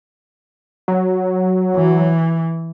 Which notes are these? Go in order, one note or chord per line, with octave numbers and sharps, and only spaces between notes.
F#3
E3